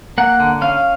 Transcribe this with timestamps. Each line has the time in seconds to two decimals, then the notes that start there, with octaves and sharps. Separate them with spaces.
0.18 A#3 F#5
0.40 D3
0.61 C#4 F5